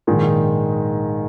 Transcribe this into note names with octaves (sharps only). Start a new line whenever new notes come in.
A#1 G#2 D#3 G#3 D#4